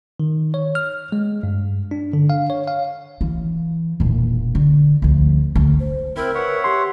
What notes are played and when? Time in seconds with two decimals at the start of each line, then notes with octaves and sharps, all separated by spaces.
0.20 D#3
0.54 C#5
0.75 F6
1.12 G#3
1.43 G2
1.91 D4
2.13 D3
2.30 F5
2.50 C#5
2.68 F5
3.21 E3
4.00 E1 A#2
4.55 D3
5.02 D2 F3
5.55 D2
5.80 C5
6.16 C4 E4 A#4 B5
6.35 B4 C#5 E5 F#5
6.64 G4 C6